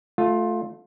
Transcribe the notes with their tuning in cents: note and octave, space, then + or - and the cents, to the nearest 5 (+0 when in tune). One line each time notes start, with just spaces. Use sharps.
A3 -10 F4 +15